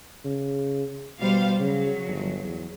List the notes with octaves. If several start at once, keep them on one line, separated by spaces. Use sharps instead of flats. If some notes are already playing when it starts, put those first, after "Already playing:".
C#3
B2 G3 C5 F5
C#3 F#3
G1
E2